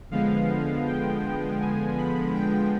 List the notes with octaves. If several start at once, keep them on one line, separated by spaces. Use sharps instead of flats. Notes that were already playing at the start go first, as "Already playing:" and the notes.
D3 F3 G#3 B3 F5
G5
G#5
B5
G5